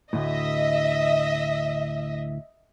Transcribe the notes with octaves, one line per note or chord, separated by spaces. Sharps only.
D2 A2 D#5 E5